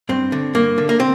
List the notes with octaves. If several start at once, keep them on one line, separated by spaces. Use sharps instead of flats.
G2 C4
D3
G2 A#3
D3
A#3
C4